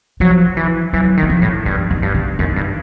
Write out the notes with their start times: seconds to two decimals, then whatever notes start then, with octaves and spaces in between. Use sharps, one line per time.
0.20 F3 F#3
0.57 E3
0.93 E3 F#3
1.17 D#3
1.23 F#3
1.30 F3
1.42 A2
1.65 G2 E3
1.90 D#3
2.02 G2
2.15 D3
2.39 F#2 D#3
2.56 G2